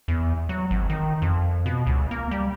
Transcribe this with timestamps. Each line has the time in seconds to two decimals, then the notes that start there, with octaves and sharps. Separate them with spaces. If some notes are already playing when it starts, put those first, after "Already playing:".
0.08 E2
0.49 F#3
0.71 G#1
0.90 D#3
1.22 F2
1.66 B2
1.87 C#2
2.11 A#3
2.31 G3